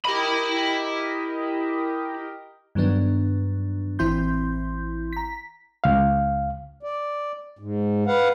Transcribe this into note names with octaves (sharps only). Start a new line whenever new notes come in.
E4 G4 A#4 D#5 B5
G2 D#3 F#3 B3 D4
A1 E3 C4 E4 C6 G6
A#5 B6
C#2 F5
D5
G#2
B4 F5 F#5